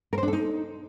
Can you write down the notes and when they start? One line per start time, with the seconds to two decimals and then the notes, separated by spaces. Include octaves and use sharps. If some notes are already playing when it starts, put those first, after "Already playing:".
0.13 A#4
0.18 C5
0.23 D4
0.28 A4
0.33 D#4